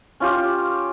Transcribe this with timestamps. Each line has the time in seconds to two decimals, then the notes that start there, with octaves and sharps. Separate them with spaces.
0.20 C#4 F4 G4